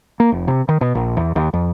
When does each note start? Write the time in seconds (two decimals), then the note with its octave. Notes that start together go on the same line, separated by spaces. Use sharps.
0.20 A#3
0.32 F1
0.48 C3
0.69 D#3
0.81 B2
0.95 A#1
1.17 E2
1.36 D#2
1.54 F2